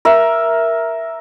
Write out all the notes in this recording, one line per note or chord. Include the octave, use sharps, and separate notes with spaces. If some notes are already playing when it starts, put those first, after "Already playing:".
A#4 E5